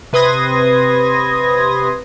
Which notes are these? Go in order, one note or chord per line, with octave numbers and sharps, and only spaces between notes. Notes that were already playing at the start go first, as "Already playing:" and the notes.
C3 B4 C6 D#6 G#6 A#6